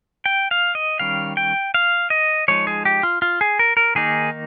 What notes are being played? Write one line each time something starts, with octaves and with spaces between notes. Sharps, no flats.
G5
F5
D#5
D#3 G3 C#4 F5
G5
F5
D#5
F3 G#3 D#4 C#5
G#4
G4
F4
F4
G#4
A#4
A#4
D#3 A#3 D#4 G#4